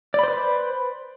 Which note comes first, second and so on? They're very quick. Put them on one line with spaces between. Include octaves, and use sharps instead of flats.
D5 B5 C5 B4